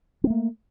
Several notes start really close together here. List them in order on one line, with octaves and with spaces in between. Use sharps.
C4 A3 A#3